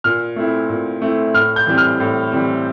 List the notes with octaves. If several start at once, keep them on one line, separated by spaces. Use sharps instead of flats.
A#2 F6
A3 C4 E4
A#2
A3 C4 E4
A2 F6
G6
E3 G3 C4
F6
A2
E3 G3 C4